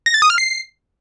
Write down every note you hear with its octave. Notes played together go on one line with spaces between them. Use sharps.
A#6
A6
D#6
F6
C7